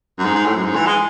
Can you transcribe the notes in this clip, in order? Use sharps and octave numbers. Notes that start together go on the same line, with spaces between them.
F#2
G#2
G#2
A2
F#2
G#2
E3
G#3